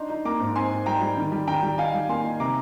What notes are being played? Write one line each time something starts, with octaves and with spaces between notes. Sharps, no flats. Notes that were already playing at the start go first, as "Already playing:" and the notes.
Already playing: D4 D#4 C6
D#4
A#3 A#5 D6
G#2
C4 G#5 C6
G#2
G3 G5 A#5
G3
D#3
G3
D#3 G5 A#5
G3
D#4 F5 G#5
G3
A#3 G#5 C6
D#4
C3 A#5 D6